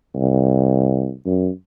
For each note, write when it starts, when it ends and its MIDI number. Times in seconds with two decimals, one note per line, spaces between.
0.15 1.13 36
1.26 1.50 42